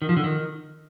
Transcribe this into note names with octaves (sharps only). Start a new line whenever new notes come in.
D#3
F3
D3
D#3